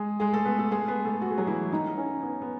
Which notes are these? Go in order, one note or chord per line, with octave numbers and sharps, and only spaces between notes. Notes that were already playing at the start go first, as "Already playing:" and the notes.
Already playing: G#3 G#4
G#3 G#4
A3 A4
B3 B4
A3 A4
G#3 G#4
B3 B4
A3 A4
F#4
G#4
F#3 F#4
E3 E4
D#3 D#4
C#4
B3
B3